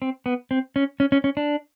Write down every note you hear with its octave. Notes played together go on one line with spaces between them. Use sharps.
C4
B3
C4
C#4
C#4
C#4
C#4
D4